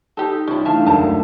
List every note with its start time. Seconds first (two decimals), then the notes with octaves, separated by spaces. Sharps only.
0.17 D#4 G4 A4
0.48 C2 C#4 E4 F4
0.65 E3 A3 D4 E5 F5 A5
0.86 F#1 D2 A5 A#5